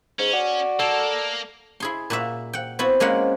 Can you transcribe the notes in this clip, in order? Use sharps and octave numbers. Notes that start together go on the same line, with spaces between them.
G#2 C#4
F#4 D5
A#3 A4
E4 G#4 C6
A#2 F#4 E5 F5
F#5 G5
B3 C4 E4 F#4
G#3 A#3 C#4 C5 F#5